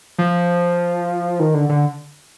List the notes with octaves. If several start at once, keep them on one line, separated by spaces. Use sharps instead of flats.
F3
D#3
D3
D3